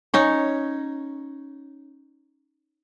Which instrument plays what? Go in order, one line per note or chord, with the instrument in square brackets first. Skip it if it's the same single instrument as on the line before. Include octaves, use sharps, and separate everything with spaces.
[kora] C#4 D#4 C#5